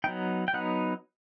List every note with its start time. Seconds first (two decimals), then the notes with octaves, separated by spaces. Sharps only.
0.04 F#3 B3 D#4 G5
0.48 G5
0.53 F#3 B3 D#4 F#5